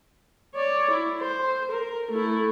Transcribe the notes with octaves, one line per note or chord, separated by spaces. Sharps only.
C#5 D5
E4
C5
A#4
A3 E4